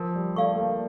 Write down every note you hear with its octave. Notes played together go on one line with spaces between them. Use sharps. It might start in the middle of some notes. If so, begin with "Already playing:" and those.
Already playing: F3 A#4
G3
A3 D5 F5 C#6
A3
A#3